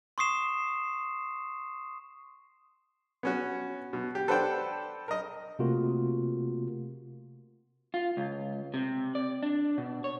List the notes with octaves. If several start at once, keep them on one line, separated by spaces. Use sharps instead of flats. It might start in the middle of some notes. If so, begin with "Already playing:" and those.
C6 C#6 D#6 C7 E7
B3 C#4 F#4
B2
G4
A4 B4 C5 D5 F#5 G5
A#4 D#5
C3 A3 A#3 F4 F#4 A#4
F4
C#2
C3
D5
D4
B2
C#5